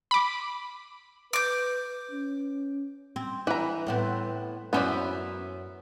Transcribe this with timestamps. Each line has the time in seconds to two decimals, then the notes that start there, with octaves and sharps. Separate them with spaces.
0.11 B5 D6
1.33 B4 D6 G6
2.11 C#4
3.16 C4
3.47 E3 B4 A#5
3.87 A2 B3 C4
4.73 F#2 B3 C#4 E4 C5 D5